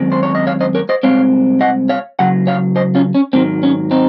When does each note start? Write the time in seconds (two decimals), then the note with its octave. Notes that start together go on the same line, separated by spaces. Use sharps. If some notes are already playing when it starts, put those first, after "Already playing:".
Already playing: F#2 D#3 G#3 C4
0.12 C5
0.23 C#5
0.35 D#5
0.47 C#5 F5
0.61 C5 D#5
0.75 A#4 C#5
0.89 C5 D#5
1.03 C2 A#2 G#3 C4 C#5 F5
1.61 D#5 F#5
1.89 C#5 F5
2.19 C#2 C#3 F#3 F#5
2.47 C#5 F5
2.76 C5 D#5
2.95 C#4 F4
3.15 C#4
3.33 G#2 D#3 F#3 C4
3.63 C#4
3.91 C4 D#4